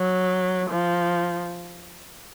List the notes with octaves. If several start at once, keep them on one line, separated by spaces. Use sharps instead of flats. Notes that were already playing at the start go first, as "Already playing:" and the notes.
Already playing: F#3
F3